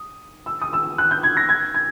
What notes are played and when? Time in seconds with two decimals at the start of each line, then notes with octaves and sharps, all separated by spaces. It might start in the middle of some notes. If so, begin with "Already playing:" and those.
Already playing: D#6
0.46 E6
0.62 D#6
0.73 E6
0.98 F#6
1.11 G6
1.23 G#6
1.37 A#6
1.49 G#6
1.75 G#6